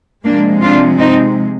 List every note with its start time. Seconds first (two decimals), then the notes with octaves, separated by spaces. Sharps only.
0.25 C3 F3 G#3 A#3 D4
0.62 D4 F4
0.99 C4 D#4